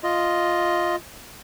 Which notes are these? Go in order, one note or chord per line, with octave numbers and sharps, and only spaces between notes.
F4 D#5